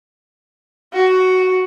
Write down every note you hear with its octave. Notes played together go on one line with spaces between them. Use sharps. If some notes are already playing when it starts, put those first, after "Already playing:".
F#4